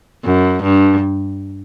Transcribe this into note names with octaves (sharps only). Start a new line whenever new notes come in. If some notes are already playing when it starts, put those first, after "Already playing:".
F#2
G2